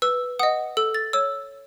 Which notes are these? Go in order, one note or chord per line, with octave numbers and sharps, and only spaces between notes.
B4 E6
D#5 F#5 D#6
A4 E6
A6
C#5 E6